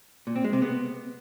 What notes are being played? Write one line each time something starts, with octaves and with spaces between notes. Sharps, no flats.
A#2
C4
G#3
C3
B3